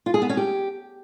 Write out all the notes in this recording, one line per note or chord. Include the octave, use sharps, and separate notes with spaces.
F4
G#4
B3
C#4
G4